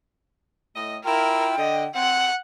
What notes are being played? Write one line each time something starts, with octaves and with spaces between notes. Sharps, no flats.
A2 D#5
E4 F4 A#4 G5
D3 D#5
C4 F#5